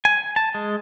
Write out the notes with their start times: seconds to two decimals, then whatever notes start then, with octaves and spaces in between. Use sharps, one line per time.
0.05 G#5
0.36 A5
0.54 G#3